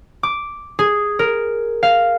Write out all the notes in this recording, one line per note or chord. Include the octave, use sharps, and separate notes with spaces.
D6
G#4
A#4
F5